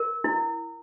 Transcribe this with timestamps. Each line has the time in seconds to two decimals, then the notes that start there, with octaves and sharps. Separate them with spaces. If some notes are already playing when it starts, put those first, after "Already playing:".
Already playing: A#4
0.24 E4